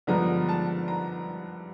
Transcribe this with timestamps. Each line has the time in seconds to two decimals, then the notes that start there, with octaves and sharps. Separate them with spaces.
0.07 G2 D3 F3 G#3 B3 A#5
0.49 A5
0.88 A#5